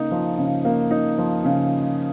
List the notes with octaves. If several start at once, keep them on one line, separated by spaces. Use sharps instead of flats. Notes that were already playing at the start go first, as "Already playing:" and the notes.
Already playing: C#3 A#3 D#4
F3
C#3
A#3
D#4
F3
C#3